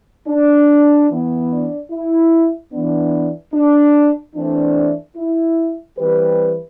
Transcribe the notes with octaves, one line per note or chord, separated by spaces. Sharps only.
D4
E3 B3
D4
E4
E3 B3 D4
D4
E3 A3 C4 D4
E4
E3 G3 C4 G4 B4